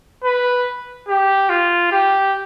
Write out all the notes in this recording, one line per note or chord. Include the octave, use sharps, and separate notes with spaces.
B4
G4
F4
G4